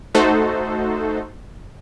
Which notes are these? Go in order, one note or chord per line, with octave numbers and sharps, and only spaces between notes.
A3 D#4 F#4 A4 C5